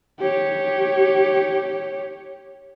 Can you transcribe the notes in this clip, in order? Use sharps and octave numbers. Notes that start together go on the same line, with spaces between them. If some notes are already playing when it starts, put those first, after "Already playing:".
G4 C#5